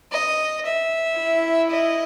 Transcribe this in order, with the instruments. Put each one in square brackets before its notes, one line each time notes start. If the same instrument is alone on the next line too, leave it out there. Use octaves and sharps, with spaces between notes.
[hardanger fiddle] D#5
E5
[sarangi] E4
[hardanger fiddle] D#5